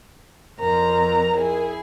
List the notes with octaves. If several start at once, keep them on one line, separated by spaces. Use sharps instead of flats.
F2 A#4 A#5
E4 G#4